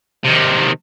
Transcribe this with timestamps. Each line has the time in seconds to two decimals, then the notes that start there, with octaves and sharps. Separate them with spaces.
0.24 C3 D#3